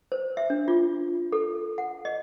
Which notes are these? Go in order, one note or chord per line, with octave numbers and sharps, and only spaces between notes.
C5
E5
D4
F4
A4
F#5
D#5